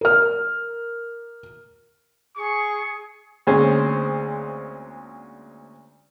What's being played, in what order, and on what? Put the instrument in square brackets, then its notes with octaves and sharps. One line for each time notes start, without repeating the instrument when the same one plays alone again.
[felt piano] A#4 F6
[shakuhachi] G#4 [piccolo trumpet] C#6
[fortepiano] D2 A#2 G#3 C4 C#4 C5